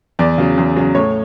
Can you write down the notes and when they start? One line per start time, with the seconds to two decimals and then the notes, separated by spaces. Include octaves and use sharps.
0.19 E2 D5
0.38 C#3 F#3
0.58 E2
0.76 C#3 F#3
0.95 A2 C#5